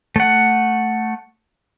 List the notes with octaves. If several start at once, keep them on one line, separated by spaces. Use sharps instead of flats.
A3 F#5